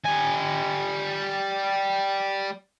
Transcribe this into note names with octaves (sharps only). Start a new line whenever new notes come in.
G3 G#5